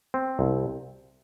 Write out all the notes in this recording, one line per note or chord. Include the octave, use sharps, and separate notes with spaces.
C4
C2